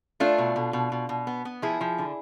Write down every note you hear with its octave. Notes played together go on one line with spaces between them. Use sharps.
A3 D4 F4
B2
B2
B2
B2
B2
B3
B3
F3 E4 G#4
F3
D3